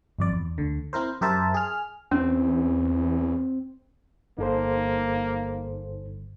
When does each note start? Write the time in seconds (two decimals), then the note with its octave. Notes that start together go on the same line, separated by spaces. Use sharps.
0.19 G1 F2 D5
0.33 E2
0.58 D2 D3
0.93 C4 E4 A#4 C5
1.21 F#2 G4 A#4 C5 E5 A5
1.54 G#4 F6
2.11 E2 C4 C#4
4.38 G1 A#3 D#4 A4 C5